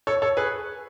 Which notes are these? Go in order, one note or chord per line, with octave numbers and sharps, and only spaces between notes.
A4 C#5
A4 C#5
G#4 B4